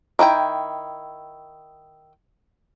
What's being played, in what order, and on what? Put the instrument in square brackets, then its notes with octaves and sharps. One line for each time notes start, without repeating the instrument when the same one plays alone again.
[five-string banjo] D#3 D4 E4 G5